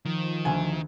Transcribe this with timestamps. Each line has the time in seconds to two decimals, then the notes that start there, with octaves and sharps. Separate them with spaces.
0.05 D#3 F3
0.45 D2 G#5